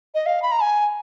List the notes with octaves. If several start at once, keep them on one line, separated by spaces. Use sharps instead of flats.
D#5
F5
B5
A#5
G#5